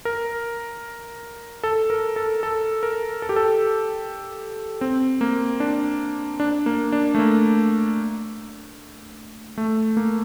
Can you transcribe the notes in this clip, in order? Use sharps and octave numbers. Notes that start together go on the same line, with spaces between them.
A#4
A4
A#4
A4
A4
A#4
A4
G4
A4
C4
A#3
D4
D4
A#3
D4
A3
A#3
A3
A#3